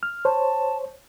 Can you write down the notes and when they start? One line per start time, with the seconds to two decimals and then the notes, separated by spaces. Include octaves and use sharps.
0.03 F6
0.25 C5 C#5 A5